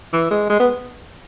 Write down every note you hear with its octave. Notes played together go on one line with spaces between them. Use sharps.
E3
G#3
G#3
B3